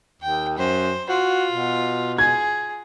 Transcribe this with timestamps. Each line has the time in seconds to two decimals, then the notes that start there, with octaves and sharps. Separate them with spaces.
0.22 D#2 G5
0.58 F#2 C5
1.09 F4 F#4
1.52 B2
2.18 G#4 G#6